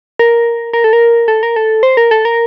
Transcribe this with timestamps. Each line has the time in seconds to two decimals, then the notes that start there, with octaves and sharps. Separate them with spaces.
0.19 A#4
0.73 A#4
0.84 A4
0.93 A#4
1.28 A4
1.43 A#4
1.56 A4
1.83 C5
1.97 A#4
2.11 A4
2.25 A#4